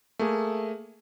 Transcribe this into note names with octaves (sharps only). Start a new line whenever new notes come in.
A3 A#3 G#4